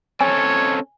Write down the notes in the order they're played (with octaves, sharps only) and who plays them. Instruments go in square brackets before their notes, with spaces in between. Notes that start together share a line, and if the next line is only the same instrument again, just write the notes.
[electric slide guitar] C4 C#4 A4 [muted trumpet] C#5 [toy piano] G#5